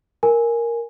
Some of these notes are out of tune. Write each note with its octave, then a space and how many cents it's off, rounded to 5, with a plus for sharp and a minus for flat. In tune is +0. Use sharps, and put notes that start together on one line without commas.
A#4 +0 G#5 +0